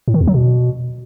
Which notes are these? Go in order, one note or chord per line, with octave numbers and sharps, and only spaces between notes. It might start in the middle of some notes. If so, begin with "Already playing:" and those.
A2
D#3
E2
F#3
B2